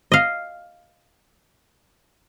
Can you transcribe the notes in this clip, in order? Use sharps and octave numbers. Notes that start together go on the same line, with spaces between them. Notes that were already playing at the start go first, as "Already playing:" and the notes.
D#5 F5